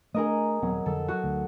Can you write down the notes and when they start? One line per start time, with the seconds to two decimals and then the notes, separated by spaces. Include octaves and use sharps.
0.14 A3 C#4 D4 G#4 A#4 D#5
0.62 D#1 F#3 B3 C4
0.86 F2 D3 F#3 A4
1.08 F#4
1.24 D2